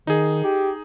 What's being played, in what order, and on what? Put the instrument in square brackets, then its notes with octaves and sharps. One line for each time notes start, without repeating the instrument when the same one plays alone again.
[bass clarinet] D#3 [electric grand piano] D#4 G#4
[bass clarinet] G4